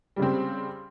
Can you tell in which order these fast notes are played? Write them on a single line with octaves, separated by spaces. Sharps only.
G3 C#3 C4